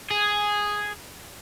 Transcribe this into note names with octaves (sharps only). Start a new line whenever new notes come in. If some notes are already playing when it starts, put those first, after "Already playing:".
G#4